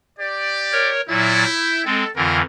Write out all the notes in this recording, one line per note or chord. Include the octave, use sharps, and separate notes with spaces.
G4 D5
A#4 C#5
A#2 F#3 E4 A6
G6
G#3 C4 A4
F2 D3 E3 A3 F4 A#4